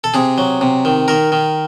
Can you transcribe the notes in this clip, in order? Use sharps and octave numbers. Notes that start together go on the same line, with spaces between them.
A4
C3 G#4
F#3
C3
D#3
D#3 A#4
D#3